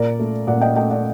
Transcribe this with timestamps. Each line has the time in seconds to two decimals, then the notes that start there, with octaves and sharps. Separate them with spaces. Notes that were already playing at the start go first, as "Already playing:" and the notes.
Already playing: A#2 A#4 D5
0.19 A3
0.47 A#2 D5 F#5
0.61 D#5 G5
0.76 A3 D#5 G5
0.90 D5 F#5